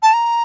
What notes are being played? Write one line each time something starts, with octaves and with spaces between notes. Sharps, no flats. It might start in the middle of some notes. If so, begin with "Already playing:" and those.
A5
A#5